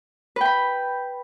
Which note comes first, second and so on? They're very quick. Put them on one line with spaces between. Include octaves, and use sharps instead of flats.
B4 G5 B5